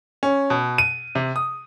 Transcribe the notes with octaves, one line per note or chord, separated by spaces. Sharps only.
C#4
B2
D#7
C3
D#6